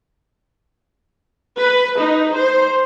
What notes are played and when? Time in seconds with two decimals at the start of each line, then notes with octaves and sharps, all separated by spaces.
1.60 B4
2.01 D#4
2.35 C5